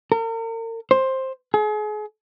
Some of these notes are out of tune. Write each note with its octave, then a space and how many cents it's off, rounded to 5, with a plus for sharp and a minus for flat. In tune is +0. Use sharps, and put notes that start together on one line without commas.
A#4 -40
C5 +10
G#4 +35